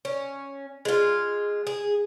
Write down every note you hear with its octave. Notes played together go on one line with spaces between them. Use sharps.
C#4
G#3 F4
G#4